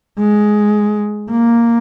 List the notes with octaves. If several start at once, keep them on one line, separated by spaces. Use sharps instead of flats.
G#3
A#3